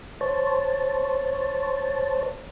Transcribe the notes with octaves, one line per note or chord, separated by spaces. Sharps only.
C5 C#5 A5